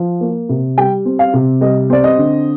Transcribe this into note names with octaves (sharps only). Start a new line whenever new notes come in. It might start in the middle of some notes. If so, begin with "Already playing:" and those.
Already playing: F3
A#3
C3
G3 G5
C4
F5
C3
G3 D#5
C4 D5
D#5
D3